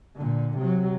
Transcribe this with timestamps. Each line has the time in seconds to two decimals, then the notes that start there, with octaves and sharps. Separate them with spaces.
0.16 A#2 D3
0.58 C3 F#3